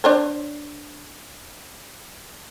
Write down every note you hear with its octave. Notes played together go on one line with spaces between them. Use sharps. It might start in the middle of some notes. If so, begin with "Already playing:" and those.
D4 C5 C#5